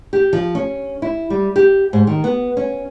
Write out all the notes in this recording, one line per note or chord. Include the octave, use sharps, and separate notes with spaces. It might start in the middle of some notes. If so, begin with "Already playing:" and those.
G4
F3
C#4
E4
G3
G4
G#2
D#3
B3
C#4